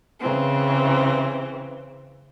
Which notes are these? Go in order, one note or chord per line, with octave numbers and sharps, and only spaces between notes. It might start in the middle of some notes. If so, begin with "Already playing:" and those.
C#3 E3 C4